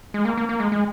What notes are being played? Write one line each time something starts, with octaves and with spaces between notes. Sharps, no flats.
G#3
A#3
A#3
A#3
G#3
G#3